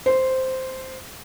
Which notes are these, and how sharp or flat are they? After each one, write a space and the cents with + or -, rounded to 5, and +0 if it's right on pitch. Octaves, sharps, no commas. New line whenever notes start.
C5 -5